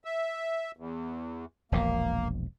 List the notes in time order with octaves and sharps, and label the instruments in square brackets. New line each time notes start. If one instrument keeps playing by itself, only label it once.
[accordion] E5
E2
[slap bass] E1 A#1 B2 [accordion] A#3